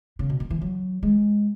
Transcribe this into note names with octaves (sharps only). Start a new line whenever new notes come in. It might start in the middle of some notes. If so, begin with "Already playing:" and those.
C#3
B2
D#3
E3
F#3
G#3